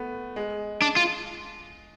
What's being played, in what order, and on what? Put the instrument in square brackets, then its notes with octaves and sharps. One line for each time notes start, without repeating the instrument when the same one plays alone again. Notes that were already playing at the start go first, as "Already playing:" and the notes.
Already playing: [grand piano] A3 B3
G#3
[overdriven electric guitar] D4
F4